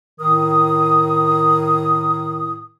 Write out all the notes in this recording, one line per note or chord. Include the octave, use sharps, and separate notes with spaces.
A2 D#3 A#4 D#6